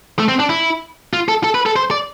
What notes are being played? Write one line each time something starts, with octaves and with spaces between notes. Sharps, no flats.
A3
C4
D4
E4
F4
A4
A4
B4
A4
C5
D5